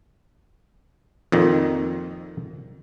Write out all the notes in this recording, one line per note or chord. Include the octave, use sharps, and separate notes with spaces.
F2 A#2 D#3